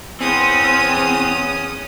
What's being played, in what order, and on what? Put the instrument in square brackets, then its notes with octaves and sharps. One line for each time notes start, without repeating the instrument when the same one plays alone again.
[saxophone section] E2 [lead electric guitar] C4 [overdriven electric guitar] C#4 [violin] D#6